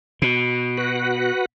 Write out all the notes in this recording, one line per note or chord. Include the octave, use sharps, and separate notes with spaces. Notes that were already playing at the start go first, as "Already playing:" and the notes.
B2
F#4 B4 F#5